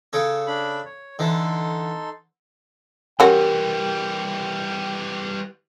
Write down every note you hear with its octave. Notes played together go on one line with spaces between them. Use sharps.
C#3 A4 C#5
D4 B5
C#5
D3 E3 D#4 A4 C6
E3 G3 C#4 F#4 G4 A#4 G5